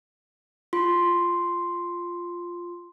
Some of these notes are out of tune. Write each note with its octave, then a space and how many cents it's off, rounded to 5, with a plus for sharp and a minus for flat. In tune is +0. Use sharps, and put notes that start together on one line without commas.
F4 +0 C6 +0